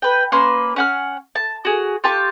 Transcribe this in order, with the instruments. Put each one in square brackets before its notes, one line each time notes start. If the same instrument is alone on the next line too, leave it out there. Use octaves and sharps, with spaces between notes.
[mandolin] B4 G5
A#3 C#4 B4 C6
C#4 F#5 F6
A5
F#4 G#4
F4 G4 A5 C#6